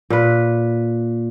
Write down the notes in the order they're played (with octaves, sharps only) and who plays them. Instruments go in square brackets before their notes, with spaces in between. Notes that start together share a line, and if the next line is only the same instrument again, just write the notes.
[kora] A#2 B4